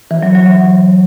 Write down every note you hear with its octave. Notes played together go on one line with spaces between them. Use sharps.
E3
F#3
F#3